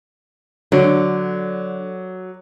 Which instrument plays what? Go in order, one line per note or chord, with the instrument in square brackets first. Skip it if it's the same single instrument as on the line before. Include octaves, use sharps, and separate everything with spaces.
[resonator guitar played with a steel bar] D3 [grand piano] F#3